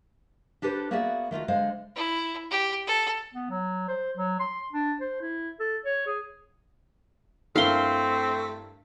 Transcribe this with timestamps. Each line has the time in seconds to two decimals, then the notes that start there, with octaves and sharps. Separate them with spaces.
0.62 D4 G4 A4 B4 C5
0.91 A#3 B3 F#4 G#4 D5 E5
1.31 D#3 A3 F4 F#4
1.48 D3 G#3 C5 D#5 F5
1.96 E4
2.51 G4
2.87 A4
3.34 B3
3.50 F#3
3.88 C5
4.17 F#3
4.40 C6
4.73 D4
5.01 C5
5.22 E4
5.60 A4
5.85 C#5
6.07 G#4
7.56 G2 A3 C4 E4 A#4 F5 C6